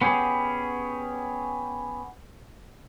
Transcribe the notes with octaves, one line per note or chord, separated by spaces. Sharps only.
B3 C#4 G4 G#4